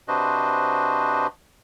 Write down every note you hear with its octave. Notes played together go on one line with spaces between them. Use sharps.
C3 D4 F#4 B4 C5 D#5